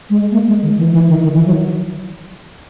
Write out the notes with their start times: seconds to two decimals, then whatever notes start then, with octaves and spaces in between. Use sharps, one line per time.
0.10 G#3
0.32 A#3
0.48 G#3
0.63 D#3
0.78 E3
0.93 E3
1.08 D#3
1.23 D#3
1.34 E3
1.46 F#3